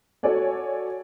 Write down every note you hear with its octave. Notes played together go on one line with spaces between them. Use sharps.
F#4 A4 C#5 D5 G#5